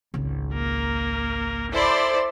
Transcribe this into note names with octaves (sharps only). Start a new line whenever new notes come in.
G#1 C#2
A#3 A#4
E4 A4 C5 D5 C6